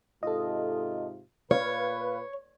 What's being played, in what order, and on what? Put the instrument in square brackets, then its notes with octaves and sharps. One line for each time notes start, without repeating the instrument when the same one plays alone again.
[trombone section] G#2 C3 F4 [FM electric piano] A4 D#5
[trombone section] A#2 B4 [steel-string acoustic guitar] C#5 [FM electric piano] F5